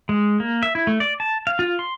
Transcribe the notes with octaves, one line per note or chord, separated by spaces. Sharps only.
G#3
A#3
E5
E4
A3
D5
A5
F5
F4
C6